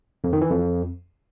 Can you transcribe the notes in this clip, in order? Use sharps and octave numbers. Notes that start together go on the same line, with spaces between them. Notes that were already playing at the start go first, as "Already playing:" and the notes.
F2
D#3
E3
F2